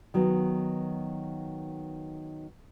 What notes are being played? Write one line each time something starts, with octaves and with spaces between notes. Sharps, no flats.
D#3 F#3 B3